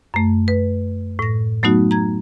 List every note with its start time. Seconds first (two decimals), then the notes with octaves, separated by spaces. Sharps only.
0.14 F#2 A3
0.48 B4
1.19 A2 A#6
1.63 F#3 A3 B3 D#4 F#4
1.91 A#5 G#6